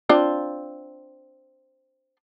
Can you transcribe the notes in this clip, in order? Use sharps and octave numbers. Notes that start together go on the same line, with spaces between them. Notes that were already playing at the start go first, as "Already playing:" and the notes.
C4 D4 F4